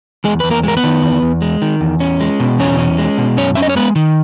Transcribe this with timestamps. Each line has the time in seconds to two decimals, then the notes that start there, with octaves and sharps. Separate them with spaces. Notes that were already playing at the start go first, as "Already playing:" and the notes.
0.24 E2 G#3 G#4
0.40 E2 B4
0.50 A#3 A#4
0.63 G#3 A#4
0.77 B3 B4
0.84 D#3
1.03 E2
1.22 E2
1.42 G#3
1.62 D#3
1.81 E2
2.00 C#4
2.21 G#3
2.40 B2
2.59 E2 C#4 C#5
2.79 C#4
2.98 G#3
3.18 B2
3.37 F#2 C#4 C#5
3.55 C#4 E5
3.62 D#5
3.69 C#5
3.76 G#3 B3 B4
3.96 D#3